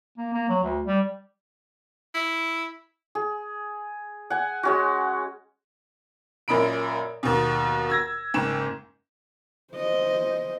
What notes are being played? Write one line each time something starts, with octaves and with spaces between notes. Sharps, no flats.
A#3
A#3
F#3
D2
G3
E4
G#4
F#5 G#5
G#3 C#4 F#4
F#2 A#2 D#5 B5 D7
D#2 B2
E6 G#6 A#6
F#1 G#2 G5 E7
C5 D#5